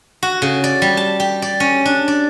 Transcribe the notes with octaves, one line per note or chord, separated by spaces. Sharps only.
F#4
C#3
D5
G3
A5
G4
D5
C#4
D4
D5